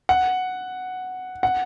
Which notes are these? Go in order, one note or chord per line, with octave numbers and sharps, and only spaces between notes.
F#5
F#5